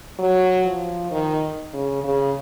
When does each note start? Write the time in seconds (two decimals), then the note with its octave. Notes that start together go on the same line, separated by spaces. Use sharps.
0.19 F#3
0.66 F3
1.11 D#3
1.73 C#3
2.04 C#3